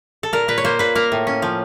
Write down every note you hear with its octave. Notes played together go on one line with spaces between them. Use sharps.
A4
A#2 A#4
A#2 B4
C#5
A#3 C5
A#2 B4
A#3 A#4
A2
C#4
F3